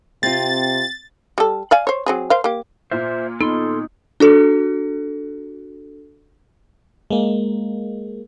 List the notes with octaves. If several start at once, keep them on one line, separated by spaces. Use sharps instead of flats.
C3 C4 F4 A6
G3 A4
D5 F5 G#5
C5 C#5
F#3 C4 G#4
A#4 C5 F5
A#3 G4
A#2 F4 C5 E5 F6
B3 D#4 A4 C6
D4 F#4 A4
G#3 A#3